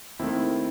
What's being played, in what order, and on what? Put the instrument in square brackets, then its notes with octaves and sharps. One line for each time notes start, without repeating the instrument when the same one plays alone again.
[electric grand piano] D#2 D#3 A3 C4 E4